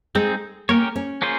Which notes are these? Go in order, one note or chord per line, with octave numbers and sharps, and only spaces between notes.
G#3 C4 D#4 G#4
A#3 C#4 G4 A#4 C#5
C#4
A#3 C#4 F4 G#4 C5